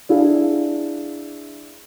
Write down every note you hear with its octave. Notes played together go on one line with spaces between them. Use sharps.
D4 E4 G#4 F5